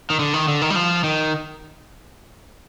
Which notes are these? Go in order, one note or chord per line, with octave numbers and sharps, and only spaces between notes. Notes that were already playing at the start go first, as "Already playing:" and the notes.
D#3
D3
D#3
D3
D#3
G3
F3
D#3